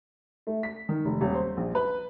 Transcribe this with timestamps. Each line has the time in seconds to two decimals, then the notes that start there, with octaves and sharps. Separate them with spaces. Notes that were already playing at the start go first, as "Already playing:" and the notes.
0.47 A3
0.63 B6
0.89 D#3
1.05 F1
1.21 D#1
1.35 C5
1.57 A#1
1.75 B4